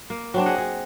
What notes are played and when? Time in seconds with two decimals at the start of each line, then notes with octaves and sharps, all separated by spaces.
0.10 A#3
0.34 F#3 C4 D4
0.46 G#4 D#5 F#5
0.58 G#4